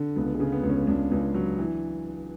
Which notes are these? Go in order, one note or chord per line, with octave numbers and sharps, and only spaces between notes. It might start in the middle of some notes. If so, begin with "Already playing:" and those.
Already playing: D3
C#2 B3
G#3
C#3
B3
C#2
C#4
C#2 D4
C#2
F#3
E3